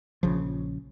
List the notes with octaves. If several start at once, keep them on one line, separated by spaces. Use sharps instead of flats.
A#1 C#3 F3